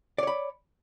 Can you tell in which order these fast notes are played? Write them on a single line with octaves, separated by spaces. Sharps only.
D5 C#5 B5